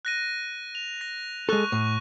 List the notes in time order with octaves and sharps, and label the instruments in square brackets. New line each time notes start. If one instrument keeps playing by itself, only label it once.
[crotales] F#6 A#6 D#7
F7
A#6
[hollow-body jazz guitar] G#3 A4 [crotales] C#6 F#6
[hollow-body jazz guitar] A2 [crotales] C#6